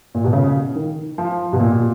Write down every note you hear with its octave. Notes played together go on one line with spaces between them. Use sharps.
A#2
B2
C#3
D#3
F3
B2
A#2